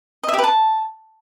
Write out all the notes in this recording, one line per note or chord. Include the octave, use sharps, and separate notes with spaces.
D#5
E5
G4
B4
A5